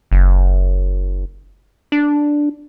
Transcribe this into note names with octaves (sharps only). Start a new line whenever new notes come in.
F#1
D4